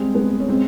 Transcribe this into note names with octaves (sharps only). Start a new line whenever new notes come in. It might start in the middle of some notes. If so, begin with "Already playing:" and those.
Already playing: G3 G#3 C4
G#3 B3
C#4
G#3 C4